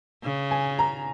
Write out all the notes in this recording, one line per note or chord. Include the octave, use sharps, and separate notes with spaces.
C#3
G#5
A#5